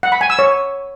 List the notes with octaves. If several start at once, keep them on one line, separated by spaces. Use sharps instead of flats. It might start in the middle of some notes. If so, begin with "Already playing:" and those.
F#5
B5
G#5
E6
C#5